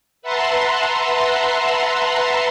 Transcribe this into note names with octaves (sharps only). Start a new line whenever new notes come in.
B4 E5 F#5 A5 A#5 C6